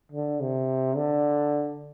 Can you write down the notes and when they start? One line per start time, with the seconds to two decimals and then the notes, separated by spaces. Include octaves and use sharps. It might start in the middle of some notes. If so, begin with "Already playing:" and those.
0.12 D3
0.41 C3
0.96 D3